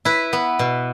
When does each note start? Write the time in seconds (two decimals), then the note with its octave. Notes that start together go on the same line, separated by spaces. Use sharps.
0.05 E4 B4
0.33 B3
0.59 B2